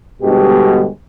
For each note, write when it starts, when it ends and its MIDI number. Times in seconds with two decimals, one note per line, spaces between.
0.22 0.85 31
0.22 0.85 47
0.22 0.85 56
0.22 0.85 67